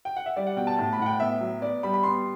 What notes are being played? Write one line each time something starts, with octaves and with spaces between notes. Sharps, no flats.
G5
F#5
E5
G3 D5
F#5
B2 G5
A5
A2 A5
B5
A2 F#5
G5
B3 E5
F#3
B3 D5
G3 B5
B5
B3 C6